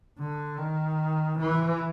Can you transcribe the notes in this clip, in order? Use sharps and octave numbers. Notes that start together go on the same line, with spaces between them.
D3
D#3
E3